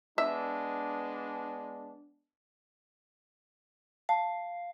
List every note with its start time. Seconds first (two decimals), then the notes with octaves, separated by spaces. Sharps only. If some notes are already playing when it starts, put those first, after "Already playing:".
0.18 G#3 B3 D4 E5
4.09 F5 A5